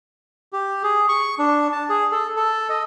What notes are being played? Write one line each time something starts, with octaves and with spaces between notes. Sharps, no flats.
G4
G#4
C#6
D4
A5
G#4
A4
A4
D#5